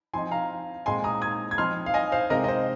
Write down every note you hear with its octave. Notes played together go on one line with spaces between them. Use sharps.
F3 C4 D#4 G#5 C6
F5 A#5
A#2 G#3 C4 D#4 G#5 C6
A#5 D#6
D#6 G#6
G#6
F3 C4 D#4 C6 F6
F5
D#5 G#5
C5 F5
C3 G#3 C4 D#4 A#4 D#5
D#5
C5